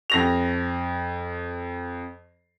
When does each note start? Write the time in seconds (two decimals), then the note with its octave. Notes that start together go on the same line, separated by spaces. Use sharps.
0.10 F2 A#6 F7